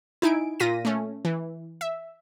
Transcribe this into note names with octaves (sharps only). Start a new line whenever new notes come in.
D#4 E4 G#5 D7
A#2 F4 A#6 B6 D#7
A3 C#4
E3
E5